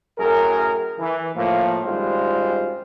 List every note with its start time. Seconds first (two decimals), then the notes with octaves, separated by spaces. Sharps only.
0.19 F#2 A2 G#4 A#4
0.99 E3
1.36 A2 F3 A#3
1.85 G#1 F#2 G3 G#3 F4 C5